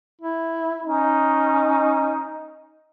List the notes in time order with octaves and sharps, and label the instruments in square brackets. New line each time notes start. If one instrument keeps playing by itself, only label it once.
[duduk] E4
[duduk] C#4 [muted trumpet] D#4